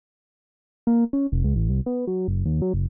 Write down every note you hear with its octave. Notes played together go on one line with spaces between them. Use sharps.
A#3
C#4
F1
C#2
A1
C2
B3
F#3
F#1
D#2
F#3
F#1